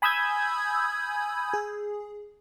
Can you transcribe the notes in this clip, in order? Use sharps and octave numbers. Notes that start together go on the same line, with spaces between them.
G#5 B5 D#6 E6 G6 G#6
G#4